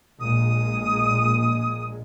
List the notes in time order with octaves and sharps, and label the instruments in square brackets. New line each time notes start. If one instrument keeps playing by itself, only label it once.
[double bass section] A#1 A#2 G#3 [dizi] D#6